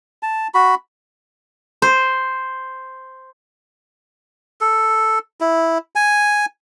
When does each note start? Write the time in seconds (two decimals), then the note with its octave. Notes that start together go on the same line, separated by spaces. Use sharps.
0.23 A5
0.54 F#4 B5
1.82 C5
4.61 A4
5.41 E4
5.96 G#5